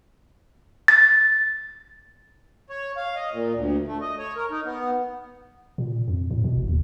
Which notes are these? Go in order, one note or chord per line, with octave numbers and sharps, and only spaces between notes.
A6
C#5
F5
D#5
A#2
D2
A3
D#5
C#5
A#4
D#4
B3
A#2
F2
A2
B2
F#1
D#2